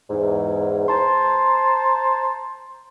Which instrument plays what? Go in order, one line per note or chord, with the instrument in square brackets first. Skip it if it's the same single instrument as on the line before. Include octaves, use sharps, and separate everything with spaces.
[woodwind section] E2 G#2
C5 A5 A#5 C6